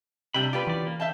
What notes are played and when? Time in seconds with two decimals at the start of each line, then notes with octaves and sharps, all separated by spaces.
0.34 C3 G3 D4 G5 B5
0.53 A#3 F4 G4 B4 D5
0.67 C#3 E3 D5
0.86 A#3
1.00 D3 E5 F5 G5 A5